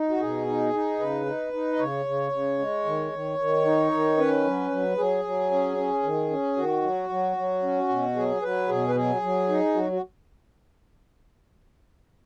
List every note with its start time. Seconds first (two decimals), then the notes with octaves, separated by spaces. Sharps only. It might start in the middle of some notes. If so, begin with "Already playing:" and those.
Already playing: D#4
0.09 F#4
0.20 B2 G#4
0.47 D#4
0.73 D#4
0.99 C#3 B4
1.26 D#4
1.53 D#4
1.73 D#5
1.79 C#3 C#5
2.06 C#3
2.32 C#3
2.59 G#3
2.85 D#3
3.12 D#3
3.38 D#3
3.65 D#4
3.92 D#3
4.18 C#4 B4
4.45 F#3
4.71 F#3
4.97 F#3 G#4
5.24 F#3
5.51 C#4
5.77 C#4
6.03 D#3
6.30 C#4
6.56 D#3 F#4
6.83 F#3
7.09 F#3
7.37 F#3
7.63 C#4
7.89 B2
8.16 F#3 G#4
8.42 F#3 B4
8.69 B2 G#4
8.88 B4
8.95 F#3 G#4
9.22 F#3
9.49 D#4
9.74 F#3 F#4
9.92 F#4